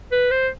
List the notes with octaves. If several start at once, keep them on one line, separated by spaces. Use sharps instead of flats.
B4
C5